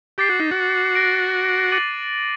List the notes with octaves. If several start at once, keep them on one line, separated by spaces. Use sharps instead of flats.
G4 D6 A6 C7
F#4
D#4
F#4
F#6 A#6 D7
D6 A6 D#7 F#7